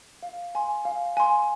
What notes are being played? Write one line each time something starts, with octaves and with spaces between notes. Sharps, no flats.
F5
G#5 C6
F5
G#5 C6